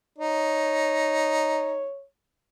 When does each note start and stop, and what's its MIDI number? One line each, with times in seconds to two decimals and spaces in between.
0.18 1.86 63
0.18 2.05 73